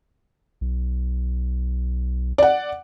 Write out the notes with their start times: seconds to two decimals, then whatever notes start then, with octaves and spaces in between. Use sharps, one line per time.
0.61 B1
2.38 D5 F#5